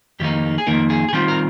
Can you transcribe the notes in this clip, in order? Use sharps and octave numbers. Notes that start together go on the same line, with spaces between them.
F2 D#3 A#3 D#4 G4
G#4
F2 D#3 A#3 D#4 A#4
G#4
G#4
D#3 G3 C4 F4 G4
A#4